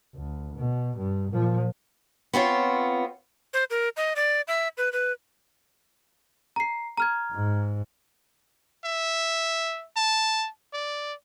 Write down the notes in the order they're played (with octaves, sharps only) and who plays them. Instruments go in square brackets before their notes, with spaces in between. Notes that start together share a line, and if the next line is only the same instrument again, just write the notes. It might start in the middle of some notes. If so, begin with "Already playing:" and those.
[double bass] D2
B2
G2
A#2 F3
[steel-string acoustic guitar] B3 C4 F4 C#5
[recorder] C5
A#4
D#5
D5
E5
B4
B4
[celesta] A#5 C7
A#5 F6 G#6
[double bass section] G#2
[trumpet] E5
A5
D5